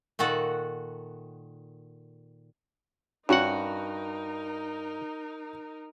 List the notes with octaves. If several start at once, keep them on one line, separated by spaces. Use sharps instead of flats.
A#2 D#3 F#4 A4 F#5
G2 C#4 D#4 F#4 A#4 F#5